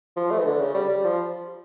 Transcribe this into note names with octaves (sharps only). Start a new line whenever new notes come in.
F3
A3
E3
D3
C#3
G3
G3
F3